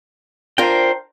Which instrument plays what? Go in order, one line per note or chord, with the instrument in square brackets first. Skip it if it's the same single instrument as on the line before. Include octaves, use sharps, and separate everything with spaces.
[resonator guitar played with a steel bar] D4 F4 A#4 [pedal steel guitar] C5 G5